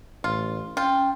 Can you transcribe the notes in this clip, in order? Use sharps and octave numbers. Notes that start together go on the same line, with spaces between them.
A1 F4
C#4 F4 G5